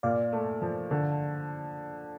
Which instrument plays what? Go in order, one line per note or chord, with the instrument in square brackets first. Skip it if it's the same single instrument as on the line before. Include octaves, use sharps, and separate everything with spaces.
[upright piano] A#2 [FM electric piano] D5 F5
[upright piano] A3
F3
D3